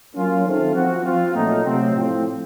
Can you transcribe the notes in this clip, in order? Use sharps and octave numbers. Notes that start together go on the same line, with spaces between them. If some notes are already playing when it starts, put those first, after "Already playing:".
F#3 A#3 C#4 F4
D#3 A3 C4 F4
F3 C4 F#4
F3 C4 F4
A#2 F#3 A3 D#4
C3 F#3 A3 C4
A2 F3 C4